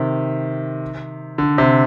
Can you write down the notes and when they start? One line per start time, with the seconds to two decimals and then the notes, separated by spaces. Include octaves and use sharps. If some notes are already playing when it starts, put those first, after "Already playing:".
Already playing: C3 D#3
1.38 D3
1.58 C3